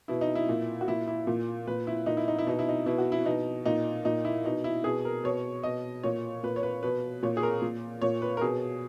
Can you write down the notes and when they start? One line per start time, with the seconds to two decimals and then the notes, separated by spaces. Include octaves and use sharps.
0.08 B2 E4
0.21 D#4
0.35 E4
0.49 A#2
0.81 F#4
0.88 A#2 E4
1.07 E4
1.27 A#2
1.67 A#2 B4
1.87 E4
2.06 A#2 D#4
2.17 E4
2.28 D#4
2.38 E4
2.47 B2 D#4
2.59 E4
2.69 D#4
2.86 B2 E4
2.98 F#4
3.12 E4
3.26 B2 D#4
3.66 A#2 D#4
4.05 A#2 D#4
4.25 E4
4.45 B2 D#4
4.64 E4
4.84 B2 G#4
5.05 A#4
5.24 B2 C#5
5.63 B2 D#5
6.03 A#2 C#5
6.43 A#2 B4
6.56 C#5
6.63 B4
6.83 B2 B4
7.23 A#2 C#5
7.37 G#4
7.43 A#4
7.62 A#2
8.02 A#2 C#5
8.22 B4
8.37 A#4
8.41 B2 G#4